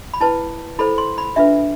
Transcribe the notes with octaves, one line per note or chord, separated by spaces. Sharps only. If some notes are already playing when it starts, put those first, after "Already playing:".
B5
E4 B4 A5
E4 A4 C5 B5
C6
B5
D4 F4 B4 E5